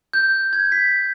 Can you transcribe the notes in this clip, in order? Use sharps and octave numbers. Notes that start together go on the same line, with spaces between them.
G6
G#6
B6